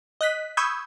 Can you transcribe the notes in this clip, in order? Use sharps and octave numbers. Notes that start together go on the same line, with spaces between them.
D#5 F#6 B6
B5 C#6 D#6 E6 G6 G#6